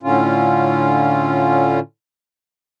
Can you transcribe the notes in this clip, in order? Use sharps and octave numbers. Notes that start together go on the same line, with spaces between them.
A2 D3 C#4 F4